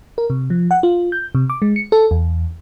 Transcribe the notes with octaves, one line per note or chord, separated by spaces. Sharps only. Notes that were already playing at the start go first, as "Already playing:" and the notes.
A#4
C3
F3
F#5
F4
G6
C3
D6
G#3
C#7
A4
E2